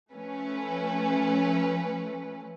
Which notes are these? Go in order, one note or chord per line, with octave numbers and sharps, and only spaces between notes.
F3 A3 C#4 B4